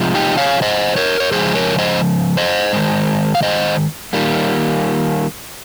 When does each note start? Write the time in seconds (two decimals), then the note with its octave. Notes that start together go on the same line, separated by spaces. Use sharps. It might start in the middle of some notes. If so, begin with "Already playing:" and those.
Already playing: C3 F3 G#3
0.15 D#4 G4
0.38 C#5 F5
0.62 C5 D#5
0.96 A#4 C#5
1.20 C#5
1.31 C#3 F3 G#3 G#4 C5
1.55 A#4 C#5
1.78 C5 D#5
2.37 C5 D#5
2.73 D#3 G#3
3.35 F5
3.43 C5 D#5
4.13 D#3 G3 A#3